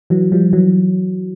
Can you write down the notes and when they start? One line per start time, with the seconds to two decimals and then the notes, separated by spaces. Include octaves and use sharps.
0.10 E3 F#3
0.32 F3 G3
0.53 E3 F#3